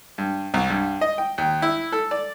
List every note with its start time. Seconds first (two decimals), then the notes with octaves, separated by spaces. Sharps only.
0.18 G2
0.54 C2
0.70 G2
1.01 D#5
1.18 G5
1.38 D#2
1.62 E4
1.92 A4
2.11 D5